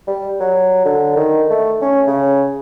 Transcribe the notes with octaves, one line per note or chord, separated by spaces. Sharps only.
G3
F#3
D3
D#3
A3
C#4
C#3